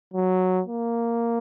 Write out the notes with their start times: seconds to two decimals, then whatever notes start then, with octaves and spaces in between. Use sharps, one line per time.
0.14 F#3
0.67 A#3